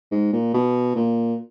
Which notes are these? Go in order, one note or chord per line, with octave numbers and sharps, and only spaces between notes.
G#2
A#2
B2
A#2